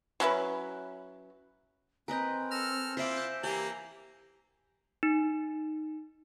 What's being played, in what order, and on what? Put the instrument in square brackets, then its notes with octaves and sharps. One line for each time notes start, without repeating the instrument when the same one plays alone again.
[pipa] F#3 C#4 E4 B4
[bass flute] C4 [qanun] A#4 B4 D#5 [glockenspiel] G#5 G6
[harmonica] A4 E6 F6 [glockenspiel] A#6
[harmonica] E4 F4 [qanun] C5 E5 D6 [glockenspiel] B6 D7
[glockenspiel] E6 G6 E7
[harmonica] E3 A#3 A#5 [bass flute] G4 [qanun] G5 G#5 [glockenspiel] F#7
[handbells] D#4